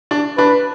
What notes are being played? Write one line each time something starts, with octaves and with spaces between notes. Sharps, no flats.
D4
D4 B4